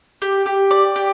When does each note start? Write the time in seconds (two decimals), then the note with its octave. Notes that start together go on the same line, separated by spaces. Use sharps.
0.22 G4
0.46 G4
0.71 D5
0.96 G4